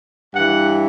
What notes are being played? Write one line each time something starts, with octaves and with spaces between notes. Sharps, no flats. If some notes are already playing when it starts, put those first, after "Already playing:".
G2 E3 F#5